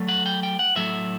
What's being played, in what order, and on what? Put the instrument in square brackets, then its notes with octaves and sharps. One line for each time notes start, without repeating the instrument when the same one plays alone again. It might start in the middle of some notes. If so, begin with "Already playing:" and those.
Already playing: [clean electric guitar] F#3 A3
F#5
G5
G5
F#5
A2 F#3 A3 E5